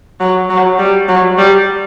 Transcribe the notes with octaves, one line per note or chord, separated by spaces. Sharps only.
F#3
F#3
G3
F#3
G3